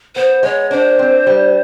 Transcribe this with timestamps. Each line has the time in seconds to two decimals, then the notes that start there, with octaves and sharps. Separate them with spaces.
0.16 B3 C5
0.43 G#3 C#5
0.71 D4 C5
0.99 C4
1.27 G3